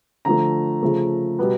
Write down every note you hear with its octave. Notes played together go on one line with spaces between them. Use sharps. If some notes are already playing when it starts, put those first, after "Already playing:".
D3 F3 A3 A#5
C#3 F3 A3
B2 G3 B3